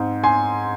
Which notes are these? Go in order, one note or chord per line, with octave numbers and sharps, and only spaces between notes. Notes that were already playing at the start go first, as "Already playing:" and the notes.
Already playing: G#2 C4
G#5 C6